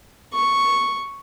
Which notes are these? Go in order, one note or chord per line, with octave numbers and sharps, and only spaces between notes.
C#6